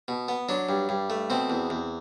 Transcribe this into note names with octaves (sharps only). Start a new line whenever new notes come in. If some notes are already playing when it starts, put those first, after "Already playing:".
B2
B3
F#3 D4
G2
G2
A3
B2 C4
E2
E2